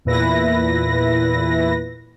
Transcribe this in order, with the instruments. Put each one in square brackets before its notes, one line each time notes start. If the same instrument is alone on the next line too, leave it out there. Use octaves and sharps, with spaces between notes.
[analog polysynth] E2 A#2 E4 B4 A#6